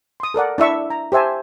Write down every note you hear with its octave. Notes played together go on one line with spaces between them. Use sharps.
C6 D#6
A4 A#4 D5 F#5
D4 E4 E5 C#6
A#5
G4 C5 E5 G#5 A5